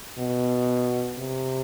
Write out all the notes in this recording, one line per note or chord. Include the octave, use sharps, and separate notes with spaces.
B2
C3